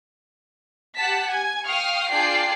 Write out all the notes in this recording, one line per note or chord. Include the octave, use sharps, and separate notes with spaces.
G4 F#5 A5 B6
G#5 G#6
F5 G5 C#6 D#6 F6
D4 F4 G#4 D5 G5 C7